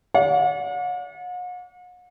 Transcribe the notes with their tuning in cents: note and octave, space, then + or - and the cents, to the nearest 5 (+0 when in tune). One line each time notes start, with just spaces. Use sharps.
D5 -45 F#5 -45